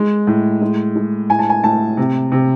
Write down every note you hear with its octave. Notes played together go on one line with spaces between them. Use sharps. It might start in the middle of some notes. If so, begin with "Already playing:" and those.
Already playing: G#3
A2
G#3
G#3
A2 G#5
A5
G#5
A2 A5
C3
C3